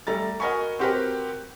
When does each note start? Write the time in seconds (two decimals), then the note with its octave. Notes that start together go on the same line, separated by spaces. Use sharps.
0.07 G3 A3 A#5 A6
0.40 F#4 A#4 D#5 G#5 B5 C#6
0.79 C4 F#4 G4 A#4 B4